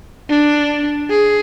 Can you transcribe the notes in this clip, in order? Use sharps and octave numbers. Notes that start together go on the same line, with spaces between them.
D4
G#4